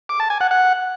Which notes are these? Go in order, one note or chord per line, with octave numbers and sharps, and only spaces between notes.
D6
A5
G#5
F#5
F#5